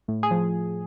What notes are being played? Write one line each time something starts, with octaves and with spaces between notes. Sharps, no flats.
A2
G#4
F3